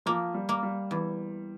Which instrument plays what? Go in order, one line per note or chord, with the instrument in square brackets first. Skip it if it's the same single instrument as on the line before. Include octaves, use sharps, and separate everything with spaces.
[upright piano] F3 [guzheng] A#3
[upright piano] G3
[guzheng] A#3
[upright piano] G3
[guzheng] E2